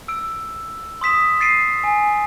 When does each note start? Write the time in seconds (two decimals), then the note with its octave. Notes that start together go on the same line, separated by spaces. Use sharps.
0.08 E6 D7
1.01 C6 D#6 B6 E7
1.41 A6 C7 D7 D#7
1.84 G#5